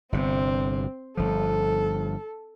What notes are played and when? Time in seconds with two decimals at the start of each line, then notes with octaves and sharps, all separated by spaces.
0.12 G1 C3 C4
1.17 G1 F3 A4